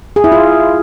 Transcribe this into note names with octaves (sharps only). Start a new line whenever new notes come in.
G#4
E4
F4